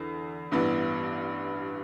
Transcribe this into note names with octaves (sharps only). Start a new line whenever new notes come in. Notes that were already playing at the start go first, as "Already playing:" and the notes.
Already playing: E2 D3
A1 G2 E3 B3